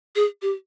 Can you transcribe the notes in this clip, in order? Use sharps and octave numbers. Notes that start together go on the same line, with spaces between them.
G#4
G4